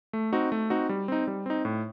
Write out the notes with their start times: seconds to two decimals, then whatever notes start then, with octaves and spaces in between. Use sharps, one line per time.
0.13 A3
0.33 C4 D#4 F#4
0.52 A3
0.70 C4 D#4 F#4
0.89 G3
1.08 C4 D#4
1.27 G3
1.46 C4 D#4
1.65 A2